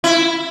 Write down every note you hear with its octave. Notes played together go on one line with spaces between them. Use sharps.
E4